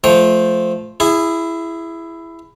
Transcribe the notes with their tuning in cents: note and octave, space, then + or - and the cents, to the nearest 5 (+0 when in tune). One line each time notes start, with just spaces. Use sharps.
F3 -5 A3 -20 G5 +0
E4 +10 G#4 -15